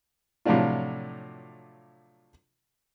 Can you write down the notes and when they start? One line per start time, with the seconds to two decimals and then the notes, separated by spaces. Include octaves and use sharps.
0.45 A2 C3 F3 F#3 D4 F4